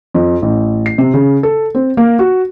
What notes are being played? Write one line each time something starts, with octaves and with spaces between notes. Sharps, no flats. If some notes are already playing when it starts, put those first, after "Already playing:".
F2
A1
C7
C3
C#3
A4
C4
A#3
F#4